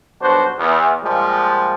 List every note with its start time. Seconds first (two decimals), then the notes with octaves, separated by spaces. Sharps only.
0.20 B1 G2 D4 F#4 C5
0.58 E2
1.02 A#2 F3 G3 G#3